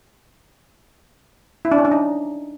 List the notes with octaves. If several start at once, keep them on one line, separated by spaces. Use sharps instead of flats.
E4
D4
C#4
D4
D#4